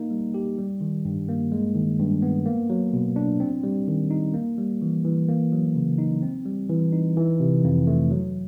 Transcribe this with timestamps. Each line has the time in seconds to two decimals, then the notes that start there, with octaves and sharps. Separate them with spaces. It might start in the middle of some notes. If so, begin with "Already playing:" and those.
Already playing: A#3 D#4
0.10 G3
0.34 G4
0.58 G3
0.81 D#3
1.05 G2
1.29 A#3
1.52 G#3
1.75 D#3
1.99 G2
2.22 B3
2.46 A#3
2.70 F#3
2.93 B2
3.16 D4
3.40 C4
3.63 G3
3.88 D#3
4.11 D#4
4.34 A#3
4.58 G3
4.82 E3
5.05 E3
5.28 A#3
5.52 F#3
5.75 C#3
5.98 D#4
6.23 C4
6.45 G3
6.69 E3
6.93 D#4
7.17 E3
7.40 C3
7.64 F2
7.87 A3
8.11 F#3